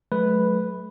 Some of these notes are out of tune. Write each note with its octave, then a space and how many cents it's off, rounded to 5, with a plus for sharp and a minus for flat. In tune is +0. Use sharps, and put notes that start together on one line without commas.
F#3 -10 A3 -40 B4 +0